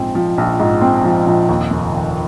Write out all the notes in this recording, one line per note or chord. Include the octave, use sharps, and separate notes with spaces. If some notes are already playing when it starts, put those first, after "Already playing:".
Already playing: A#1 G#2 F3 C4
F3
A#1
G#2
C4
F3
A#1
D#2
F1
D#3